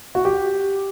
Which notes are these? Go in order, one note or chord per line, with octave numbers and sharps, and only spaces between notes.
F#4
G4